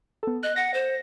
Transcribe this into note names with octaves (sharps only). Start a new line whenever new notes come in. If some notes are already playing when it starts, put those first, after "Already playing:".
B3 A4
D#5 F#6
F#5 A#6
C5